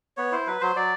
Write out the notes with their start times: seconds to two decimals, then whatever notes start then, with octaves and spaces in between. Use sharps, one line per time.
0.17 B3 C#5
0.32 E4 C5
0.47 F#3 B4
0.61 F#3 C5
0.76 F#3 D5